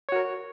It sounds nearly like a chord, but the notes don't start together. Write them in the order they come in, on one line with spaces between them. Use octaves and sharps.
C#5 F#4 A#4